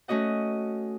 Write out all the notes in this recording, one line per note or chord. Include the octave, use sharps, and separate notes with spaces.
A3 C#4 F#4 D#5 F#5